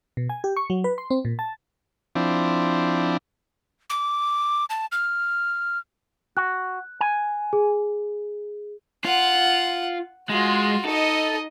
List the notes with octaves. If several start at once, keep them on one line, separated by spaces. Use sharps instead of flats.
B2
G#5
G4
C#6
F#3
B4
C6
C4
A#2
A5
F3 C4 D4 E4
D6
A5
F6
F#4 F#6
G#5
G#4
F4 F#5
G#3 F4 F#4
D#4 A4 D#5